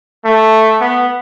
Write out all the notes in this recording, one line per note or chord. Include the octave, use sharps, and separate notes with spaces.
A3
B3